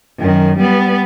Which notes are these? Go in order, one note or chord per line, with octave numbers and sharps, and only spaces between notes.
F#2 D#3
G3 B3